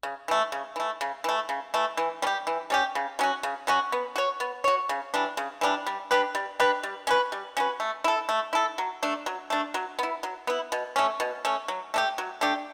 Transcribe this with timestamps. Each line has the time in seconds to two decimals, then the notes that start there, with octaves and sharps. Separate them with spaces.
0.03 C#3
0.28 E3 A3
0.52 C#3
0.76 E3 A3
1.01 C#3
1.24 E3 A3
1.49 C#3
1.74 E3 A3
1.97 E3
2.22 G3 C#4
2.27 G4
2.47 E3
2.70 G3 C#4 G4
2.95 C#3
3.19 F#3 C#4 F#4
3.43 C#3
3.67 F#3 C#4 F#4
3.92 B3
4.16 F#4 C#5
4.40 B3
4.64 F#4 C#5
4.89 C#3
5.14 E3 G3 D4
5.37 C#3
5.61 E3 G3 D4
5.87 G3
6.11 D4 G4 B4
6.35 G3
6.60 D4 G4 B4
6.83 G3
7.07 C#4 F#4 B4
7.32 G3
7.57 C#4 F#4 B4
7.80 A3
8.04 E4 A4
8.29 A3
8.53 E4 A4
8.78 F#3
9.03 A3 D4
9.26 F#3
9.50 A3 D4
9.74 F#3
9.99 B3 E4
10.23 F#3
10.47 B3 E4
10.72 B2
10.96 A3 C#4
11.20 B2
11.45 A3 C#4
11.68 F#3
11.94 A3 D4 G4
12.18 F#3
12.41 A3 D4 G4